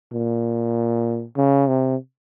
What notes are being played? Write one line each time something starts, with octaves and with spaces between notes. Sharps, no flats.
A#2
C#3
C3